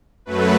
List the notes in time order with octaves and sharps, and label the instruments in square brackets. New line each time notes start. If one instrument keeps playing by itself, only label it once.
[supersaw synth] F#2 F#3 A3 B4